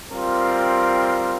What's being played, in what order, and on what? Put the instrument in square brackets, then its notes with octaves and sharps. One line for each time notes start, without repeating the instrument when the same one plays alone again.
[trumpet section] G3 C4 F4 A#4